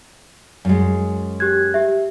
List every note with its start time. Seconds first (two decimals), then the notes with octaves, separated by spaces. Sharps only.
0.65 F#2 G#3
1.40 G4 F#6 G#6
1.74 G4 E5